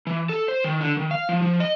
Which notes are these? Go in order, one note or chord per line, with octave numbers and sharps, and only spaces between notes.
E3
A4
C5
D#3
D3
D#3
F5
F3
F3
D#5